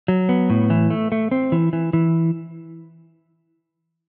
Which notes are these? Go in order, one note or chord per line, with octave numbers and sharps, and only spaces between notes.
F#3
B3
A2
E3
A3
A3
C4
E3
E3
E3